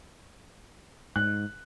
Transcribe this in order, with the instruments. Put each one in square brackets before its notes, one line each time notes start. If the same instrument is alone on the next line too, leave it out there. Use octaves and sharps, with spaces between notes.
[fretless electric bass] G#2 [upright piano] F#6